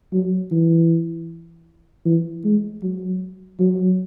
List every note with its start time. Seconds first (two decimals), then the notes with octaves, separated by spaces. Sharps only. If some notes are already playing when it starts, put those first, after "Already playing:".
0.13 F#3
0.52 E3
2.06 E3
2.45 G#3
2.83 F#3
3.60 F#3